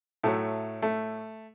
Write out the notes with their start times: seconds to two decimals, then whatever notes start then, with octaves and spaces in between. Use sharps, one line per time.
0.24 A2 F#3 A3
0.82 A3